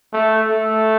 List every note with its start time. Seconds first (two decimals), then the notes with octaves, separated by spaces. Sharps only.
0.13 A3
0.50 A3